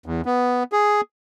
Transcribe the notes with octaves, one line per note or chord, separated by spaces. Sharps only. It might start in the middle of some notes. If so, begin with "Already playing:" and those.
E2
B3
G#4